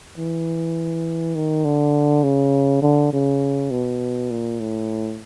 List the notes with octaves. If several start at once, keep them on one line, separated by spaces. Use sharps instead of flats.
E3
D#3
D3
C#3
D3
C#3
B2
A#2
A2